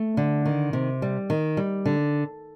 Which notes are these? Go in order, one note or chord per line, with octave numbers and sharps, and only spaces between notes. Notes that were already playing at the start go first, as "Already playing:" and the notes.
Already playing: A3
D3
D#3
C3
G3
D#3
G3
D3